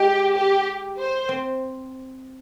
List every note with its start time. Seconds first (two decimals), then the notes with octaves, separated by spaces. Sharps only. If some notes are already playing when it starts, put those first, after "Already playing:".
Already playing: G#3 G4
0.35 G4
0.98 C5
1.29 C4